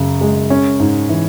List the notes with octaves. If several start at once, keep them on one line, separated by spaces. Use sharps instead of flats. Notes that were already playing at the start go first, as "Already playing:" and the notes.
Already playing: F#2 C#3
G#3
C#4
G#2
E3